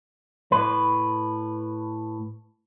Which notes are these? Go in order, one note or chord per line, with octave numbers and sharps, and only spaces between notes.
A2 B4